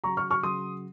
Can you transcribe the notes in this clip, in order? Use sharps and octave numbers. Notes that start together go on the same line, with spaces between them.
C#3 F#3 A#5 C#6
C#6 F6
C#6 F6
C#3 F#3 C6 D#6